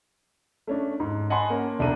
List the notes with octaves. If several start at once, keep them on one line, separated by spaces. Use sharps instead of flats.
A3 C#4 D4
G#2
D#5 F#5 G#5 A5 B5 C6
A#3 C#4
E1 C2 D4 A4 A#5 D#7